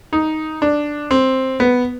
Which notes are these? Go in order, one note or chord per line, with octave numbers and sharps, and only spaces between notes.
D#4
D4
C4
B3